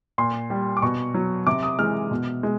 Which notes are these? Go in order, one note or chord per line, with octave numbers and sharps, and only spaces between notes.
A#2 C6
G3
D6
B2 C#6
F#3
C3 D6
D#6
E3 G#3 F6
B2
G#3